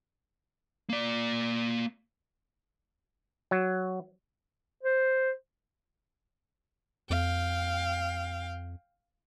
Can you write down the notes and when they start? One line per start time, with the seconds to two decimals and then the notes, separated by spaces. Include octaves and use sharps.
0.89 A#3 D5
3.51 F#3
4.83 C5
7.10 F2 F5 G5